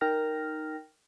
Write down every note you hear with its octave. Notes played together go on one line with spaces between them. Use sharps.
D#4 A#4 G5 F6 A#6